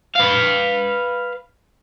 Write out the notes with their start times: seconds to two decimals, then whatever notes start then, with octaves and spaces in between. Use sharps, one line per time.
0.15 B4 F5